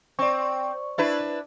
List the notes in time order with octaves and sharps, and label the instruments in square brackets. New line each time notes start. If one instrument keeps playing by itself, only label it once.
[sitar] C4 [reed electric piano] D5 C#6
[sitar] D4 E4 B4